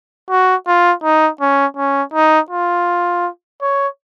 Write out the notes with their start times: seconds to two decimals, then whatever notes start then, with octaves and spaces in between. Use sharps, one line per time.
0.30 F#4
0.67 F4
1.03 D#4
1.40 C#4
1.77 C#4
2.14 D#4
2.50 F4
3.62 C#5